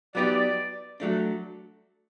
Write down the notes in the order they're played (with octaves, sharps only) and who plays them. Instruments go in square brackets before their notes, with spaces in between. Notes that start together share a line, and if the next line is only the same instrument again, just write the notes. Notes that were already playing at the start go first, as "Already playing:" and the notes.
[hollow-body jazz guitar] F#3 B3 D#4 G4 [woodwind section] D5
[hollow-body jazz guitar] F#3 A3 D4